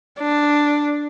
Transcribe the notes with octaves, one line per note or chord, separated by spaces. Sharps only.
D4